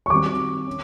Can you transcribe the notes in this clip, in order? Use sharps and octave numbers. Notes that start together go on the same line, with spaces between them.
C#6
D#3 G3 C4 D6
C#4